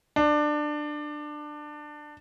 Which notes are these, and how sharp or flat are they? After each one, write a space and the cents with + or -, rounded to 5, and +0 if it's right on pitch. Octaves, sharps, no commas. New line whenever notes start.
D4 +20